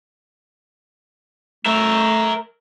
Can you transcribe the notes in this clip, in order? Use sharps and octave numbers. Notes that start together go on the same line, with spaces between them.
A3 A#4 E5